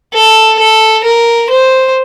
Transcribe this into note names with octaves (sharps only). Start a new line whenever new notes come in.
A4
A4
A#4
C5